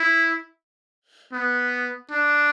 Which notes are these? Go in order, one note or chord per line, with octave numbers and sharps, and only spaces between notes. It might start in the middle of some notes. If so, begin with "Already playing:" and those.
Already playing: E4
B3
D4